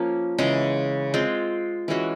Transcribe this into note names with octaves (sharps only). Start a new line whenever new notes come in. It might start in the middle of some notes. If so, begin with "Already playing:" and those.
Already playing: F3 A#3 C#4
C#3 E3 G#3
G#3 C4 F4
E3 G#3 C#4 F#4